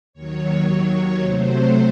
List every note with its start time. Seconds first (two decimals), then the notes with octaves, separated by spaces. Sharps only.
0.13 D#2 D#3 F#3 C#5
1.22 C3 F#3 A3 C5